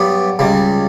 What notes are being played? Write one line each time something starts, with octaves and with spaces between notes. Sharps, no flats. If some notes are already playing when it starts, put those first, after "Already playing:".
Already playing: G2 F#3 B3 D4 G4
C#2 C#3 G3